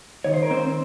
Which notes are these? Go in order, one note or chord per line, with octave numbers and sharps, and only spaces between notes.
D#3 C#5
C5
A#4
C4 C5